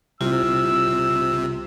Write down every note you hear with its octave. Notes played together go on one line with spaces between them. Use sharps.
C2 C3 F4 E6